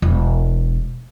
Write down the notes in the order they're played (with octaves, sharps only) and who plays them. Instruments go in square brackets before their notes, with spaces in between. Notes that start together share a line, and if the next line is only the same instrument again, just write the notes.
[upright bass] E1